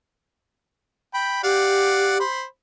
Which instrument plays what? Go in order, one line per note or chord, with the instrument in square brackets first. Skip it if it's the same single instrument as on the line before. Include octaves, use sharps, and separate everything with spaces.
[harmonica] G5 B5
[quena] G4 [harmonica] D5 F5 F#5
[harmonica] C5 B5